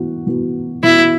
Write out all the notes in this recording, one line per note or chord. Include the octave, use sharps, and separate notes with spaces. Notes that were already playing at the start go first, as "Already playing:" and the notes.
Already playing: E3 B3 F#4
E3 B3 F#4
E3 B3 E4 F#4